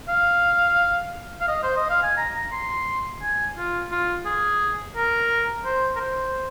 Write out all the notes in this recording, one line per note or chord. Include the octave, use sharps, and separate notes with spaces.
F5
F5
D#5
C5
D#5
F5
G#5
A#5
A#5
C6
G#5
F4
F4
G#4
A#4
C5
A#4
C5